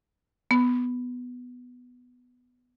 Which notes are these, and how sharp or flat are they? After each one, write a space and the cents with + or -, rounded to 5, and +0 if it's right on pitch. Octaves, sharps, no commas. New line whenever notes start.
B3 +5